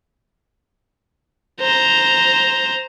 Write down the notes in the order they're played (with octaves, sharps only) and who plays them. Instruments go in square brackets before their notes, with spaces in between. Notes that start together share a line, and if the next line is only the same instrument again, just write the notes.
[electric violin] C5 A#5